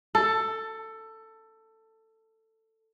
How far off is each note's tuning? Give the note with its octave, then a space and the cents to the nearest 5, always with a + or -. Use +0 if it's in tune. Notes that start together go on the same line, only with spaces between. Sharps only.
A4 +15